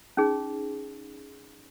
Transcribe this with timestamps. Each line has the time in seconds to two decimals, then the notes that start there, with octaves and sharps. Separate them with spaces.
0.17 C#4 D#4 G#4